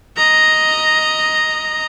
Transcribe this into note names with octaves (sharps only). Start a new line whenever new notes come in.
D#5 A#5